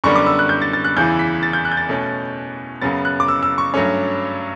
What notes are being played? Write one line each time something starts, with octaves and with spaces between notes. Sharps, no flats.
F#2 D3 G3 B3 C#6
D6
E6
F#6
G6
A6
A6
F#6
E2 C#3 E3 G6
B6
A6
G6
F#6
G6
A6
B2 A3 C#4
F#2 C#3 F#3 B3 A6
F#6
D6
E6
E6
C#6
G2 F#3 A3 C#4